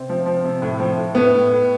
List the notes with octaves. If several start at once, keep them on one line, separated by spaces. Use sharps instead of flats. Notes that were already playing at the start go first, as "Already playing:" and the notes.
Already playing: C3 C4
F3
F3
C3
A2
F3
A2
A2 B3
A2
A2